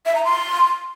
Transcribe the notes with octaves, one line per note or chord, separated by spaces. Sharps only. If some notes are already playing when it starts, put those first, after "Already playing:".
E5
A#5
C6